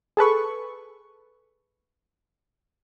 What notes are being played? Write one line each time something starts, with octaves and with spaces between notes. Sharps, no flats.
G#4 A4 B4 C#6